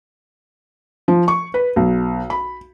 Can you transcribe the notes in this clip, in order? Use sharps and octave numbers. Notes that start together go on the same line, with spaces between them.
F3
C#6
B4
B1
B5